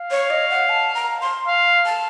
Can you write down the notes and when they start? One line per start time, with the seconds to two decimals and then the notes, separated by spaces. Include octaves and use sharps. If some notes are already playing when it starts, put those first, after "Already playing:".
Already playing: F5
0.11 C#5
0.30 D#5
0.50 F#5
0.69 A5
0.95 A#5
1.21 C6
1.47 F5
1.86 A5